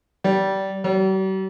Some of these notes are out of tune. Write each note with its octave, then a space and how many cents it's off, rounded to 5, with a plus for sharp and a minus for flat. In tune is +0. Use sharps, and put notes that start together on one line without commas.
G3 -20
G3 -45